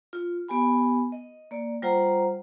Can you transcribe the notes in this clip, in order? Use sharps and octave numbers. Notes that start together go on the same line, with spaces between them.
F4
B3 G4 G#5 B5
D#5
A#3 D5
G3 F4 C5 F#5 A#5